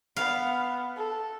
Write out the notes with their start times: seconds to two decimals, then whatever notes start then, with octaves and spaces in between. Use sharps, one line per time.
0.16 B3 F5
0.97 A4